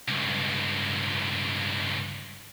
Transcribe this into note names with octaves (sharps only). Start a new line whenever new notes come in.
C#2 G2